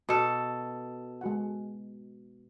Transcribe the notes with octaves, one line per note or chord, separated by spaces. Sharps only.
B2 A4
G#3 F#4 F#5